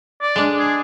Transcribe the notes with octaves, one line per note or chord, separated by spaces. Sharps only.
D5
G#3 D4
G#4